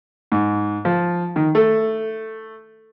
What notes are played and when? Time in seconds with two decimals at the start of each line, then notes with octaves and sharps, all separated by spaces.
0.32 G#2
0.85 F3
1.36 D#3
1.55 A3